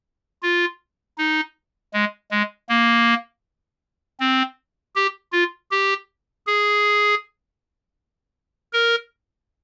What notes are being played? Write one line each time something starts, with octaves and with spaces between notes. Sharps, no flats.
F4
D#4
G#3
G#3
A#3
C4
G4
F4
G4
G#4
A#4